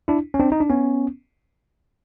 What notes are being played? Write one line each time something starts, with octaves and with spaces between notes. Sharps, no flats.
D4 E4
C#4
C4 D4
D#4
D4
B3 C#4